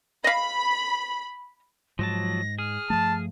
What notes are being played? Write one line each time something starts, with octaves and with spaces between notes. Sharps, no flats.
D#5 F5 B5
G#2 F3 F#3 A5 A#6
G#4 F6
G2 F3 A3 A5